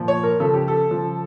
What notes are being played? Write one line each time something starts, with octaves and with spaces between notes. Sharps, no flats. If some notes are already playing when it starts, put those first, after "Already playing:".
Already playing: A#2 F3
C#5
A#4
C#3 F3 A4
G4
A4
C#3 F3